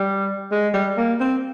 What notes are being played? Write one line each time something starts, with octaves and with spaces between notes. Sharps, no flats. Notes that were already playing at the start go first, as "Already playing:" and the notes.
Already playing: G3
G#3
G3
A#3
C4